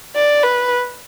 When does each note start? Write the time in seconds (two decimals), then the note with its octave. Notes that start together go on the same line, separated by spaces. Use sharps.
0.15 D5
0.43 B4